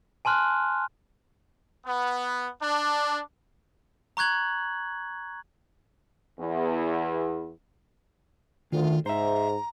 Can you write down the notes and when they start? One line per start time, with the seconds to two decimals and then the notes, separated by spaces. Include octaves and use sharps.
0.25 G#5 A5 C6 F6 F#6
1.86 B3
2.62 D4
4.17 A#5 C#6 F#6 G#6 F#7
6.40 E2
8.72 D2 D#3 F4
9.06 G#2 C5 E5 A#5